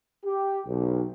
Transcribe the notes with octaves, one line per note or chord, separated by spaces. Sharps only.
G4
B1